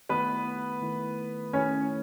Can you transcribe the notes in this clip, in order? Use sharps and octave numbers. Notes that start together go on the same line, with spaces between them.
D#3 A3 B3 E4 B4
D#3 A3 E4
D#3 A3 C#4 E4 C#5